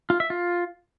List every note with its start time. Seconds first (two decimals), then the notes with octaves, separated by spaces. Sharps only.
0.10 F4
0.20 E5
0.30 F4